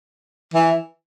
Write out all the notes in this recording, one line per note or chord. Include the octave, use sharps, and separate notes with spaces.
E3